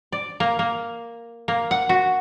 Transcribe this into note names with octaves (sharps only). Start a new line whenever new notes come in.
D5
A#3
A#3
A#3
F#5
F#4